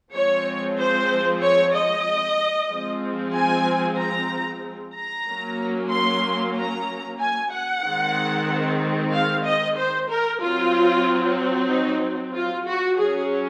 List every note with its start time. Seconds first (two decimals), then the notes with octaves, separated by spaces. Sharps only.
0.12 F3 G#3 C4 C#5
0.77 C5
1.41 C#5
1.74 D#5
2.69 F3 G#3 C4
3.33 G#5
3.98 A#5
4.95 A#5
5.27 F#3 A#3 C#4
5.90 C6
6.56 A#5
7.19 G#5
7.52 F#5
7.84 D#3 G#3 C4
9.12 F5
9.44 D#5
9.76 C5
10.09 A#4
10.41 F#3 C4 F4
11.69 D#4
12.34 F4
12.66 F#4
12.98 F#3 C#4 G#4